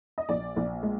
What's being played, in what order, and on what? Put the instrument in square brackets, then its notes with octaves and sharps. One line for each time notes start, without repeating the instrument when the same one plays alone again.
[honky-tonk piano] D#5
A#1 D5
A#1
G#3